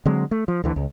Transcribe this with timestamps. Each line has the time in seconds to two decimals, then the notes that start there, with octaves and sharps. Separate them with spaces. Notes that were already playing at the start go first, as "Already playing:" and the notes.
0.06 D3 F#3 G#3 C4
0.31 A3
0.48 F3
0.64 D2 D3 E3
0.76 C#2